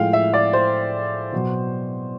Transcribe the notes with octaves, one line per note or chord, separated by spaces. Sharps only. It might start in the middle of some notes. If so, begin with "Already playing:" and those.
Already playing: A2 F3 G#3 F5 G5
E5
D5
C5
B2 F#3